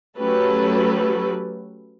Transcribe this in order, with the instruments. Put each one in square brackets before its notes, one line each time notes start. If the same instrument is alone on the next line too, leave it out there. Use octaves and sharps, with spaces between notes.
[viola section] F#3 A3 C#4 G4 A4 B4